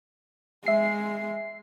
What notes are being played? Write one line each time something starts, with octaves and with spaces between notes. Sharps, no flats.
G#3 E5 C7